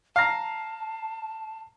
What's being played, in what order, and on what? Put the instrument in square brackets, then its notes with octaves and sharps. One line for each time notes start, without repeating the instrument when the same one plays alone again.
[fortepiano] F5 A#5 [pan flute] A5